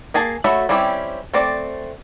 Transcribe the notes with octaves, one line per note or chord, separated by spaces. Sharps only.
A#3 G#4 G#5 A5
A3 F#4 C#5 E5 B5
G3 C4 C#4 E4 G4
A3 C4 D5